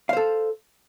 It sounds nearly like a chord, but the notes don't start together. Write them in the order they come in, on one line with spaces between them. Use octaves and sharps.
F5 C5 A4